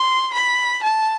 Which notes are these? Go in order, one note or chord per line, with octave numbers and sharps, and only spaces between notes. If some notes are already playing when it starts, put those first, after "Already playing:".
Already playing: C6
B5
A5